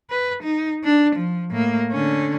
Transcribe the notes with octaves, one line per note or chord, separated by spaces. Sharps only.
B4
D#4
D4
F3
A2 A#3
D3 C#4